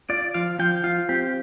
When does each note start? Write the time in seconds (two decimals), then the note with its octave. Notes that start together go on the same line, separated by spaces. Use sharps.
0.09 F4 D5
0.34 F3 F5
0.59 F3 G5
0.84 F4 F5
1.09 C4 G4